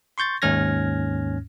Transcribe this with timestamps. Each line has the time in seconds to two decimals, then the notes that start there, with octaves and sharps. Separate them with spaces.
0.18 C6 C#6 G6 A6
0.42 D#2 G#2 C#4 F6 G#6 A#6